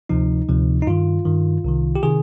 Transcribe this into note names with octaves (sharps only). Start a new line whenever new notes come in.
D2 C3 F3 D#4
D2 C3 F3
D#4
G2 D#3 F4
G2 D#3
C2 C3 D#3
G4
C3 D#3 G#4